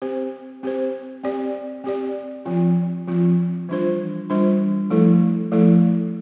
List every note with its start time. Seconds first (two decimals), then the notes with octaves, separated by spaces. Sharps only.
0.02 C4 G4 C5
0.63 C4 G4 C5
1.24 C4 G4 D5
1.84 C4 G4 D5
2.45 F3 C4 F4
3.07 F3 C4 F4
3.69 E3 G3 D4 F4 C5
4.30 E3 G3 D4 F4 C5
4.90 F3 A3 E4 A4
5.52 F3 A3 E4 A4